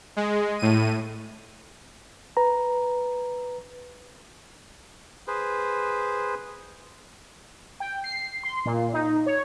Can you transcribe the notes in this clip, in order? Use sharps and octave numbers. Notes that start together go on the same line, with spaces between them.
G#3
A2 D#7
B4 A#5
G#4 B4 C5
G5
C7
C6
A#2
D#4
C#5